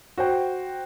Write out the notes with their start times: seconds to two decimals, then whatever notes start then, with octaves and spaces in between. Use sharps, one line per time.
0.18 F#4 C5 G5